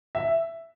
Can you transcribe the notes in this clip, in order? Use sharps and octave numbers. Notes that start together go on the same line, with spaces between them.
E5